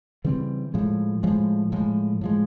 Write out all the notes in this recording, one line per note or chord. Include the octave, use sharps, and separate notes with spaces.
C#3 E3 G3 C4
A2 F3 G#3
A2 F3 G#3
A2 F3 G#3
A2 F3 G#3